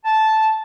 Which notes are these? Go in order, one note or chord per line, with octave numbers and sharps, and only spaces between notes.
A5